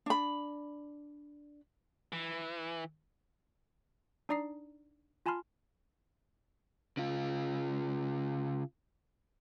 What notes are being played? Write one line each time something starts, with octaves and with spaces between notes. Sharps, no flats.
D4 B5
E3
D4 D#4 D5 A#5 D#6 C7
F4 G#5 A5 B5 C6 F6
C#3 F4